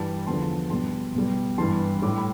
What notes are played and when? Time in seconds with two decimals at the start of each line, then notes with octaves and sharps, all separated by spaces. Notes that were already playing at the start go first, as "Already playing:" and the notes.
Already playing: G2 E3 G3 A5
0.27 E2 D3 F3 A5 C6
0.70 B2 G3 A5 C6
1.15 B2 G3
1.58 G2 E3 G3 A5 C6
2.02 A2 G3 D6
2.18 B5